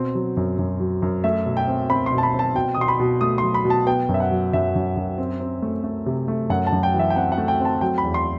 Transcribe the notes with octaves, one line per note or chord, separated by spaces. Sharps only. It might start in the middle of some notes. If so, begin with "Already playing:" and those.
Already playing: B2 C4
F#3
F#2
F#2
F#3
F#2
A3 E5
B2
G5
C4
C4 B5
C6
B2
A5
B5
C4 A5
B2 G5
D#6
B2 C6
B5
B2
A3 D#6
F#3 C6
B5
B2
A5
B3 G5
F#2
E5
F#5
F#3
F#2 E5
F#2
F#2
C4
C4
A3
A3
C3
A3
F#2 F#5
A5
F#2
G5
E3
E5
G5
C4 F#5
F#5
A3
G5
C4 A5
F#3 G5
B5
E2
C6